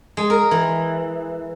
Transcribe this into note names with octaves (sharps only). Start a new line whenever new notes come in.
G#3
A#4
E3